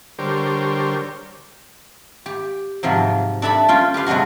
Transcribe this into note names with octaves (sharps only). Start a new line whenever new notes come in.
D3 G3 G4 A#4 C5 C#5
G4
G#2 C3 F3 F#3
D4 A4 E5 A5 B5
C#4 F4 G5
G4 B4 F5 C6
C3 F#3 G#3 D4 F#4